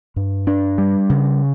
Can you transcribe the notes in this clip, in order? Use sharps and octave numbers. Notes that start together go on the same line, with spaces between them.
G2
D4
G3
C#3